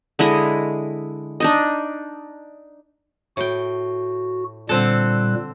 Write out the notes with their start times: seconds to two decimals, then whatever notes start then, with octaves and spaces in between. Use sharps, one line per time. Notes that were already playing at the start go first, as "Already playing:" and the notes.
0.19 D3 G#3 E4 D#5
1.40 D4 D#4 D#5
3.37 A2 F#4 G5
4.69 A#2 D3 G3 C4 A4 F#6